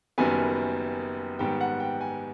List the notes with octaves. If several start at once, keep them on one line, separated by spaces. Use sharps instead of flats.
F#1 F#2 D#3 G3 B3 G#5
G#2 D#3 G3 B3 G5
F#5
G5
G#5